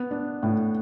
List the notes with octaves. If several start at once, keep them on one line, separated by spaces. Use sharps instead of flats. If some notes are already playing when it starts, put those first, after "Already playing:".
Already playing: B3
D4
A2